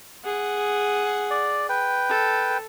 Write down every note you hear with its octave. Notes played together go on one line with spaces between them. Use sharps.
G#4 F#5
D5
B4 G5
A4